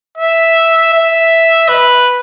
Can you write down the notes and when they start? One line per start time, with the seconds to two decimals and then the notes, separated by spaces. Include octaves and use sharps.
0.18 E5
0.93 E5
1.68 B4